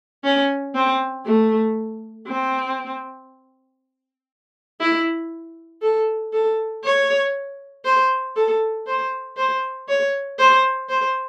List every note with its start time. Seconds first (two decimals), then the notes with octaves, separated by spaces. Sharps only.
0.24 C#4
0.75 C4
1.25 A3
2.27 C4
4.81 E4
5.82 A4
6.33 A4
6.84 C#5
7.85 C5
8.36 A4
8.87 C5
9.37 C5
9.88 C#5
10.39 C5
10.89 C5